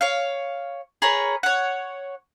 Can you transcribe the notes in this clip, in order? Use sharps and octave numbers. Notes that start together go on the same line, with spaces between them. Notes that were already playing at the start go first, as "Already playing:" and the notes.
C#5 F5
G#4 A#4 B4 C#5
C#5 F#5